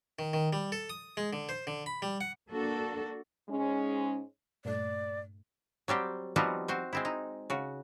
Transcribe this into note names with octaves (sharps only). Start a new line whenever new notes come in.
D#3
D#3
G3
A4
D#6
G#3
D3
C5
D3
B5
G3
F#5
A#3 D4 F#4 A4
G#2 G#3 C#4
G2 A#2 A3 D5
F#3 G3 C4 G4
F3 G3 B3 C4 D#4 F#4
C4 F#4 C5
G#3 C4 E4
D#4
C#3 F#4